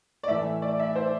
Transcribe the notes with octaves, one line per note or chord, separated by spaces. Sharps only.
D5
A2 E3 A3 E5
D5
E5
C5